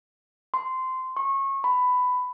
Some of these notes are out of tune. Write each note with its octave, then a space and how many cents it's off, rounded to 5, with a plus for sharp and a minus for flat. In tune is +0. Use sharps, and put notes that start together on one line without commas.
C6 -15
C#6 -25
B5 +15